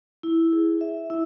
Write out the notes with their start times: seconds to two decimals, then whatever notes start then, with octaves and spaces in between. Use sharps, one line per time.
0.23 E4
0.52 G#4
0.81 E5
1.10 E4